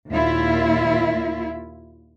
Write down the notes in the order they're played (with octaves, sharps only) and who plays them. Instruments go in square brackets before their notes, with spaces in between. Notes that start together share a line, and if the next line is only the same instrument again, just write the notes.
[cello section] D#2 A#2 E4 F4 E5